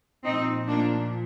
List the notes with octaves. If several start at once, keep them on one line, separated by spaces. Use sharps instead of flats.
A#2 F3 C4 D#4
A#3 D4